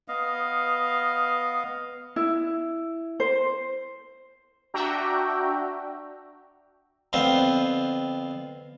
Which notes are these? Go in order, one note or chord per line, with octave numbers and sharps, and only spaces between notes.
B3 D#5 F5
E4
C5
D4 F#4 E5 G5 A#5
F2 D3 B3 C4 F4